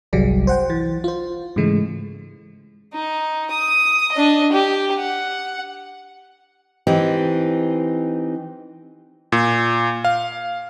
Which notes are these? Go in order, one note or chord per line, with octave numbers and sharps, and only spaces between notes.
G1 C2 F#3 G3 G#4 D5
C5 F#5 G5
E3 A6
F4 C5
G#2 C#3 E3 G#3 A3
D#4
D#6
D4 D#5
G4
F#5
E3 C4 D#4 G4
A#2
F5